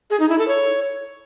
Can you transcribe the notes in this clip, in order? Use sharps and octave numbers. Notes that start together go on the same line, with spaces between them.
G#4
D#4
E4
A4
C#5